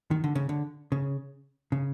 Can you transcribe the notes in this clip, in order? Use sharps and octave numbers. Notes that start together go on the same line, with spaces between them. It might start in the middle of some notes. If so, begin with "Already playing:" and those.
D#3
D3
C#3
D3
C#3
C#3